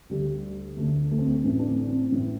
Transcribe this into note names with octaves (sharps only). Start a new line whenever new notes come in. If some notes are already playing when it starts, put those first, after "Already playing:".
D2 D3 G3
D2 D3 A3
A3
C4
A3
A1 A2 E3 C4
D4
C4
C4
A1 A2 E3